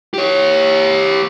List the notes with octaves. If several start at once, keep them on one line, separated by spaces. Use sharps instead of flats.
G4 C#5